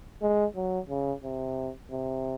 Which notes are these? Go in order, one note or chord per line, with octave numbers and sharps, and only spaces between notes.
G#3
F#3
C#3
C3
C3